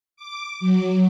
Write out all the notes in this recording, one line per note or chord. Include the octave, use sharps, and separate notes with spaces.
D6
F#3